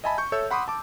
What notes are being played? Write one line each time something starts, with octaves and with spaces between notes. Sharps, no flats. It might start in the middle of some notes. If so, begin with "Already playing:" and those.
D#5 E5 G#5 A5 B5
C#6 G6
A4 C#5 E5 E6 G6
F#5 B5 C6 D6 D#6
A5 D6